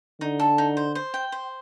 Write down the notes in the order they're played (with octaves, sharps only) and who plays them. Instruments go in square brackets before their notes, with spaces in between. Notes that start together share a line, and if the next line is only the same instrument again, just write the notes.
[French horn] D3 [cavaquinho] D#4
[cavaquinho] A4
D#4
C5
C5
G5
C5